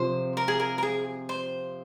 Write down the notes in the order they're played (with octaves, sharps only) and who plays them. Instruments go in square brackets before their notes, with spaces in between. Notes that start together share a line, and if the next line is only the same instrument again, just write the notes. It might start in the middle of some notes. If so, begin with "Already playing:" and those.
Already playing: [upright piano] C3 F3 C4 [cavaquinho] C5
[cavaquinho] A#4
G#4
A#4
A#4
G#4
C5